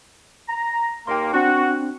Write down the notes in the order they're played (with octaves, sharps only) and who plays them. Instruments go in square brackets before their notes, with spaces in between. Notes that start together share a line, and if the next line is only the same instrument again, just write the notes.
[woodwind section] A#5
[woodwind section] D#2 A#3 [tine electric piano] G5 C6
[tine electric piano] C4 D4 [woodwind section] F#4